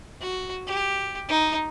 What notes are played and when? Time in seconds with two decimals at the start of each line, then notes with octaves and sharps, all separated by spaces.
0.21 F#4
0.67 G4
1.29 D#4